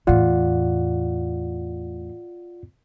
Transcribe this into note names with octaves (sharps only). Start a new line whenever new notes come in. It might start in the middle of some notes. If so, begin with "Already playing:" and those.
E2 A2 F4 D5 F#5